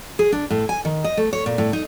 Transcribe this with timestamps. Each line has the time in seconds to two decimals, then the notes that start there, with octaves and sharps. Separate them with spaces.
0.19 G#4
0.32 D4
0.50 A2
0.69 G#5
0.85 D#3
1.04 D#5
1.17 A3
1.33 C#5
1.46 A#2
1.58 A2
1.73 D#4